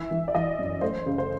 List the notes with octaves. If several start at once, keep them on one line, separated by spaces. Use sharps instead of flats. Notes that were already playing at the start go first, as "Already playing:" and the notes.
Already playing: E3 E5
E3
D5
E3 D#5
F#2
A3 C5
C#3
C5